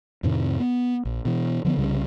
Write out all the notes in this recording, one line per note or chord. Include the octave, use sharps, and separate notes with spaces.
F2 A2 C3 D#3
B3
A#1
B2 E3
D3 F3 G#3 B3
C2 C#3 G3